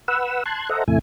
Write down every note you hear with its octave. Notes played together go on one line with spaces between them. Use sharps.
B4 F#5 E6
A5 C6 F#6 G#6
A4 C5 D#5 E5 F#5 A#5
E2 A2 C3 A3 E4 G#5